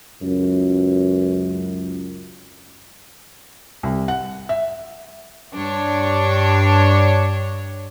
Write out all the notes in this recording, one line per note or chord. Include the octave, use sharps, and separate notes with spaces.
C#2 F#2
C2
F#5
E5
G2 D4 C#5